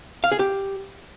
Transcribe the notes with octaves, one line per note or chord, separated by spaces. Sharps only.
F5
G#4
G4